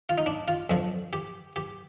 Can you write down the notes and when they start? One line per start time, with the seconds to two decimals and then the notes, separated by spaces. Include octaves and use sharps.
0.09 F4
0.18 D#4
0.26 D4
0.48 F4
0.70 F2 D3 F3
1.13 G4
1.56 G4